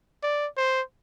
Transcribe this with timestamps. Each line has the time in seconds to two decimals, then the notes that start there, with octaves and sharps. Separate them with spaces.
0.23 D5
0.57 C5